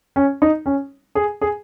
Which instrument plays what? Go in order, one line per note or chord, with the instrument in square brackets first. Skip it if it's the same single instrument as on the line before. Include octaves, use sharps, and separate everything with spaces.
[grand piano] C#4
D#4
C#4
G#4
G#4